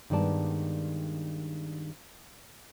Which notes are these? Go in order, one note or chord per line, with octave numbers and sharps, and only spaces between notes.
G2 D#3 G#3 B3 D5 A5